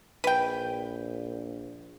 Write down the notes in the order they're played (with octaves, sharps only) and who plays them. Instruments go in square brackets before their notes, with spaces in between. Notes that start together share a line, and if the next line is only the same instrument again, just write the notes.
[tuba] A#1 [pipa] B4 G5